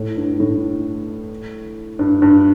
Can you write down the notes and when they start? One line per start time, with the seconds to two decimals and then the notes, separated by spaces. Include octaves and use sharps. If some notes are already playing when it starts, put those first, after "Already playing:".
Already playing: A2
0.17 G2
0.40 A2
1.99 G2
2.22 G2